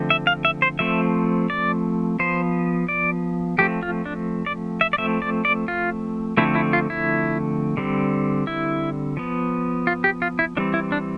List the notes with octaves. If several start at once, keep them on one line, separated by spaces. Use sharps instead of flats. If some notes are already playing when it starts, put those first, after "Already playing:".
Already playing: D3 F3 A3 C4
E5
F5
E5
C5
F3 A3 C4 E5
D5
F3 B3 C5
D5
F3 A3 C4 G4
F4
D4
D5
E5
D5
F3 A3 C4 E5
D5
D5
F4
D3 F3 A3 C4 E4
E4
F4
E4
D3 G3 C4
E4
F3 B3
F4
G4
F4
E4
E3 G3 C4 D4
E4
D4